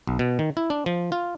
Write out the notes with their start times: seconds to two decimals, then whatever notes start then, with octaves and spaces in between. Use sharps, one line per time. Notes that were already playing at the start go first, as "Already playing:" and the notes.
0.07 B1
0.19 B2
0.39 D#3
0.57 E4
0.70 D4
0.86 F3
1.12 F4